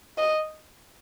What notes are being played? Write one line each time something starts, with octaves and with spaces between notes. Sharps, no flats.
D#5